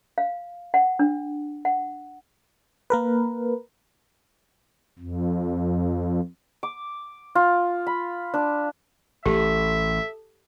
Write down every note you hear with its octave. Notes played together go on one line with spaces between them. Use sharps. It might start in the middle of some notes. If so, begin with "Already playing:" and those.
F5
F#5
D4
F#5
A#3 A#4 B4
F2
D6
F4
B5
D4
A1 A2 G4 A4 E5